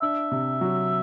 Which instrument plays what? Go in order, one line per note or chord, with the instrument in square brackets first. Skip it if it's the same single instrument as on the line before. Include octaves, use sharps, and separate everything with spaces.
[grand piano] D4 [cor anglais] E5
[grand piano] C3
F#3